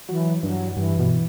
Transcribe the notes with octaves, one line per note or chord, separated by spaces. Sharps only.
E3 F#3
G2 F#3
G2 E3
B2